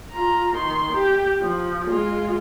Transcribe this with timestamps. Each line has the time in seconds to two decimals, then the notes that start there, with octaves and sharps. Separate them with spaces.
0.12 F4 A#5
0.56 D#3 C6
0.93 G4
1.41 F3
1.87 G#3 F4